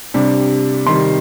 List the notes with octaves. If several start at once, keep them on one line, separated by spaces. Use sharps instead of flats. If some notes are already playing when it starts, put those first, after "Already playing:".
C3 G3 D4
C3 D#3 G3 C6